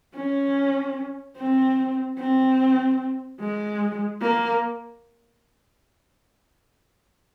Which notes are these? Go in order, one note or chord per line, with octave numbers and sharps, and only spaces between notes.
C#4
C4
C4
G#3
A#3